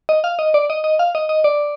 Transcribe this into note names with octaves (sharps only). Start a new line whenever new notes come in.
D#5
F5
D#5
D5
D#5
D#5
F5
D#5
D#5
D5